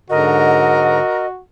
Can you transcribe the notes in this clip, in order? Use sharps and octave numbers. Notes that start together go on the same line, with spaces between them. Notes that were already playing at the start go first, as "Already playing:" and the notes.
G#2 D3 F#3 F#4 A#4 D#5